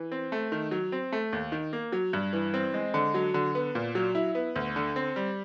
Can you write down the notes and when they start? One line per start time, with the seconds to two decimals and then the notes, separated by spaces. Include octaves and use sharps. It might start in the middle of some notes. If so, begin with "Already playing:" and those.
Already playing: E3
0.12 C4
0.32 A3
0.52 D#3
0.71 F#3
0.92 C4
1.12 A3
1.33 D#2
1.52 D#3
1.73 A#3
1.92 F#3
2.13 G2
2.33 E3
2.54 C4
2.74 G#3
2.94 D3
3.14 F#3
3.34 D3
3.55 B3
3.75 A#2
3.95 F#3
4.15 E4
4.35 B3
4.56 D2
4.76 D3
4.96 C4
5.16 G3